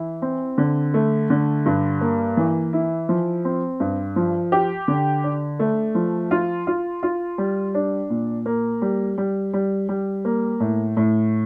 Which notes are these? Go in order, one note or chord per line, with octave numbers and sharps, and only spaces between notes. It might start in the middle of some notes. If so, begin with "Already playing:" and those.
Already playing: E3 E4
C4
D3
A3
D3
G2
A#3
E3
E4
F3
C4
G2
F3
G4
D3
D4
A3
F3
F4
F4
F4
G3
D4
A#2
A#3
G3
G3
G3
G3
A#3
A2
A2